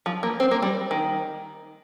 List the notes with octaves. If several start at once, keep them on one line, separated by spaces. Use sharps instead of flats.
F3
A#3
C4
A#3
G3
D#3